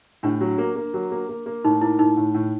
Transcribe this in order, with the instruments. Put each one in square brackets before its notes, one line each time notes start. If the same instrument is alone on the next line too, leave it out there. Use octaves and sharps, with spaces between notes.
[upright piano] A2 [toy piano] D4
[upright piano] F#3
A#3
A#3
F#3
A#3
A#3
A#3
[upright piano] A2 [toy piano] D#4
[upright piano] A#3 [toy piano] E4
[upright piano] A2 [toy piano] D#4
[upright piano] A2
A2